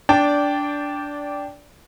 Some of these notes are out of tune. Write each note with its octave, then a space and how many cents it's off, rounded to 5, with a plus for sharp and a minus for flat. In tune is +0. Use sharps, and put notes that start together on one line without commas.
D4 -10 D5 -15 G5 +0